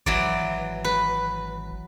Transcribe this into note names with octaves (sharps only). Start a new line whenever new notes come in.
G#1 E3 F#3 D5
B4